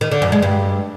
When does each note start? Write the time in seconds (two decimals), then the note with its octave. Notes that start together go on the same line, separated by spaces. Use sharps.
0.01 D#3
0.11 D3
0.22 F#2
0.32 G#3
0.42 G2